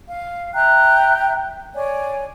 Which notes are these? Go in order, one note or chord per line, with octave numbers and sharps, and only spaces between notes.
F5
E5 G5 A#5 F#6
C#5 D5 G#5